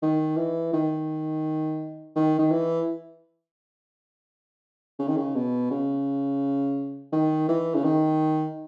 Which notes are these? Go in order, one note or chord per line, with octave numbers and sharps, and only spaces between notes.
D#3
E3
D#3
D#3
D#3
E3
C#3
D#3
C#3
B2
C#3
D#3
E3
C#3
D#3